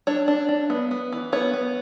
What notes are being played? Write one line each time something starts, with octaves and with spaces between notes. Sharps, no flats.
D4 C#5
D4
D4
B3
B3
E3
B3 C#5
B3